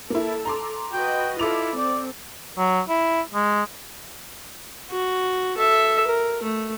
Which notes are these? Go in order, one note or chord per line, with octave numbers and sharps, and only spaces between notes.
A#3 E4 A4
A#5 C6 D6
F#4 B4 D#5 G5
E4 F4 A4 D6 F7
C4 D5
F#3
E4
G#3
F#4
A4 E5
A#4
A3